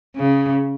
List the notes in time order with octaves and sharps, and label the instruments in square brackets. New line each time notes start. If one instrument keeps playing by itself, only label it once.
[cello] C#3